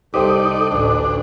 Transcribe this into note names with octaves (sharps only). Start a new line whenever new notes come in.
C2 D#4 G4 A4 C5 D5 G5
A1 D2 D4